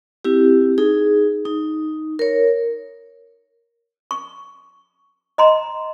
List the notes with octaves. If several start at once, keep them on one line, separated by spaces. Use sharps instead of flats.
C4 E4 G4
D#4 G#4
D#4
A#4 C#5
C#6
D#5 A#5 C6